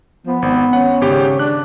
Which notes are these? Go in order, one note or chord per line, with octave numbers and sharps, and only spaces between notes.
F3 B3
G#1 C4
C#4 F#5
G#1 C#3 G4 G5
D4 F#6